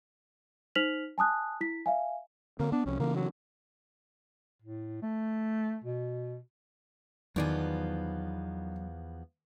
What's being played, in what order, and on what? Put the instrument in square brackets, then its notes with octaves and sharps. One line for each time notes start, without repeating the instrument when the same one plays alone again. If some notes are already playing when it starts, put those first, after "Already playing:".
[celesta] D#4 C5 F6 B6 F7 F#7
G#5 A5 D#6 F#6
E4 B6
E5 F5 G#5
[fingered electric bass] D3 C4 [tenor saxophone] A#3
[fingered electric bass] B3 [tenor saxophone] D4
[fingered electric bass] C2 F3 [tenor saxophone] C#4
[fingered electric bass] C#3 E3 [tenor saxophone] A#3
[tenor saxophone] F#3
[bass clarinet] A2
A3
B2
[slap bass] E2 [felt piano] D#3 [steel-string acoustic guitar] F3 B3 F4 [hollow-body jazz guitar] F#3 D5 G#5